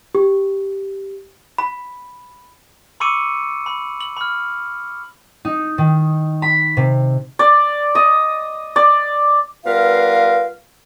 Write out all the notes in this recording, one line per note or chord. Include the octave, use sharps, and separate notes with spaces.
G4
B5
B5 C#6 D6 E6 C#7 D#7
B5
F#7
B5 F6
D#4
D#3
B5
C3
D5
D#5
D5
G3 B3 F4 A#4 B4 F5